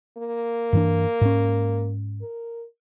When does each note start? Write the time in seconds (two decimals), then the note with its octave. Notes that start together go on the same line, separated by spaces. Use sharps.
0.18 A#3
0.73 G2 E3 D4
1.21 G#2 C#4
2.22 A#4